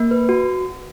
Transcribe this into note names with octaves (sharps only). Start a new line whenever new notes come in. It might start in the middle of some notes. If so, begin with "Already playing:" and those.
Already playing: A#3
B4
F#4